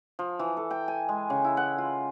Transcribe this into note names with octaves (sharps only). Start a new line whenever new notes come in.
F3
E3
A4
G5
G#5
G#3
C#3
E4
F#5
F4